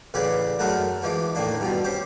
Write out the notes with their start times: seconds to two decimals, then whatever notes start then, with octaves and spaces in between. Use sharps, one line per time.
0.14 A1 C#3 G#4 B4 D5 G5
0.59 F#2 F#3 G#3 A3 A#4 F#5
1.02 E3 F3 G#3 D6
1.35 A2 D#3 A#3 D4
1.60 G2 B2 F3
1.84 C#4 G4 C5